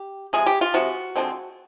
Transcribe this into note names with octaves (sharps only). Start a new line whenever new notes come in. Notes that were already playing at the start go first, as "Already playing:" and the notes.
Already playing: G4
C3 F3 G#3 G#4
G4
F4
C3 F3 G#3 F#4
D3 F3 G#3 C4